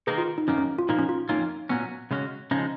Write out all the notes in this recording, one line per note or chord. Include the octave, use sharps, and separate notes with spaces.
D#3 A#3 D#4 G#4 B4
F4
D#4
F#2 D#3 A#3 C#4
C#4
F4
A#2 F3 A#3 D#4
C#4
F4
F2 D#3 A#3 C#4 D#4 F4
A#2 F#3 B3 C#4
C#3 G#3 C#4 F#4
C#3 F3 G#3 C#4 D#4